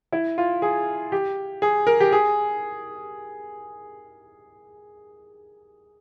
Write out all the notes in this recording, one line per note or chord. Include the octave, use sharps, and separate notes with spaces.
E4
F4
G#4
G4
G#4
A#4
G4
G#4